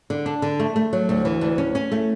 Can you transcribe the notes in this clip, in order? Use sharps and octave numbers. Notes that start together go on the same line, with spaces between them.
D3
D4
D3
A3
A3
F#3
D2
E3
D2
C#4
C#4
A3